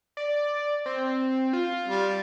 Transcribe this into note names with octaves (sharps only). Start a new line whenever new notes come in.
D5
C4
F4
G3